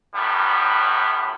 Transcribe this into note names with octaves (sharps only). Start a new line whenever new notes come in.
F#2 A2 G3 B3